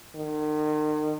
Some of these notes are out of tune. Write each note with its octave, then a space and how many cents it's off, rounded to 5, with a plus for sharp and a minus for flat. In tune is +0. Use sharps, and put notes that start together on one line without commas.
D#3 -40